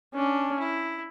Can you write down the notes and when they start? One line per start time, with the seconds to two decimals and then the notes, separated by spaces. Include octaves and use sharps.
0.15 C#4 D4
0.60 E4